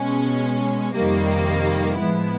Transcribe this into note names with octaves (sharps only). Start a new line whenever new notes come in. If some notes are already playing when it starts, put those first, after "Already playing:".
Already playing: B2 G#3 C#4
F2 C3 D#3 G3 A#3
A2 F3 G#3 B3 E4